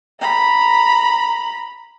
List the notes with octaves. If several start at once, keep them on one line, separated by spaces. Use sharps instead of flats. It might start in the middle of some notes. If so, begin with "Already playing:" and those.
A#5 B5